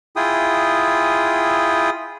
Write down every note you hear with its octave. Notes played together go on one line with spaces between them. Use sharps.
E4 F4 G#4 G5 D#6